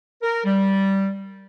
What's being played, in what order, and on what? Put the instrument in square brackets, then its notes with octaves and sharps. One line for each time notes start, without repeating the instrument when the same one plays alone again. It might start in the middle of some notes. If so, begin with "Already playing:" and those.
[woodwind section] A#4
G3